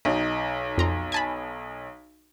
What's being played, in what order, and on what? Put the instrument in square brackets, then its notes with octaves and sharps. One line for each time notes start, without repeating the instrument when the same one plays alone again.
[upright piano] B1 D#4
[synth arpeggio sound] F2 A#5 C6
G#5 A5 B5